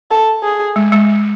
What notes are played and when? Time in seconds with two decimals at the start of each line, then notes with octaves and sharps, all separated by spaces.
0.11 A4
0.43 G#4
0.76 G#3
0.92 G#3